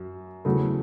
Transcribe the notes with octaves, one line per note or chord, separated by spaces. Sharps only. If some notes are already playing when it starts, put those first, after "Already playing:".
Already playing: F#2
E2 C#3 F#3 A3